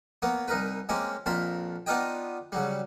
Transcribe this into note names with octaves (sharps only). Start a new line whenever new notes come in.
A#3 B3 C#5
C2 D#4 A#4 B4
G#3 A#3 C4 C#4 G4
A#1 F2 A#4 A5 B5 C6
B3 D4 D#4 F4 D#5 G5
C#3 F#3 G3